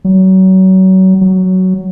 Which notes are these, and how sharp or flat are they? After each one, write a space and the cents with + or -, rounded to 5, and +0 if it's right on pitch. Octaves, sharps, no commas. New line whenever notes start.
F#3 +30
F#3 +10